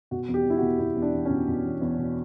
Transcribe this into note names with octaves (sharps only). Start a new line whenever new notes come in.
B2 F#4
E2
G4
E2 E4
F#4
B2
B2 E4
E2
D4
E2
C#4
B2
B2
E2
E2
B2